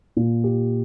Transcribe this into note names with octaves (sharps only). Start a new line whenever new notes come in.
A#2
G4